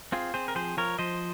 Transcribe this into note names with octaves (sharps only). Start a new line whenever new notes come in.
C4 F4 G#4
C4 G#4 C5
A#4
F3 G#4 C5
F3 A#4 C#5
F3 C5 D#5